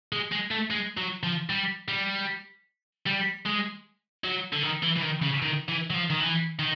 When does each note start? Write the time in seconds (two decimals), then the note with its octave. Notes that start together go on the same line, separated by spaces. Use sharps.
0.12 G#3
0.32 G#3
0.51 A3
0.70 G#3
0.97 F#3
1.23 F3
1.50 G3
1.88 G3
3.06 G3
3.45 G#3
4.24 F#3
4.53 D3
4.63 D#3
4.83 E3
4.97 E3
5.03 D#3
5.22 C#3
5.42 D#3
5.68 E3
5.90 F#3
5.94 F3
6.10 D#3
6.20 E3
6.59 D#3